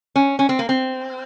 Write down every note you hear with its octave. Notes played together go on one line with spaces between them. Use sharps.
C#4
C#4
C4
A#3
C4